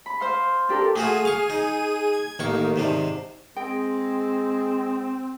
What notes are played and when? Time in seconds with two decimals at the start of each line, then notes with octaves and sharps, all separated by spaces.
0.06 B5
0.20 C5 F5 C6
0.69 D4 G4 A4 A#4
0.96 A3 F4 F#4 G#4 D#7
1.25 F5 C#6
1.50 D#4
2.13 G#6
2.39 A1 D#3 A#3 C#6
2.76 G#2 C3 D4
3.56 G#3 C4 G5